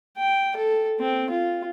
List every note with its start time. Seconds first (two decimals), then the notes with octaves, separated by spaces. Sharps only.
0.18 G5
0.56 A4
1.00 C4
1.30 F4